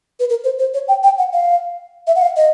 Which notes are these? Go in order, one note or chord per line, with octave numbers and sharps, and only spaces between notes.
B4
A#4
C5
C5
C#5
G5
G5
F#5
F5
E5
F#5
F5
D#5